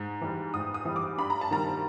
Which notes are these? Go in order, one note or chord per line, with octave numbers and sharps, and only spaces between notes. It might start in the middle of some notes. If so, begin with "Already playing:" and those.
Already playing: G#2
E3 G3
G#2 D#6
D#6
E3 G3
D6
G2 B5
A#5
A5
D#3 G3 A#5